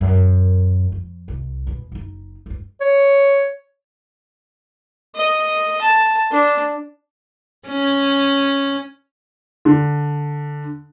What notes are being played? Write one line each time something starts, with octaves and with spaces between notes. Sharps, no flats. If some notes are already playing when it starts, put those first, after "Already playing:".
F#2 A#2
F2
C2 C3
D#1 B2
F#1 D#4
G2 D3
C#5
D#5
A5
D4
C#4
D3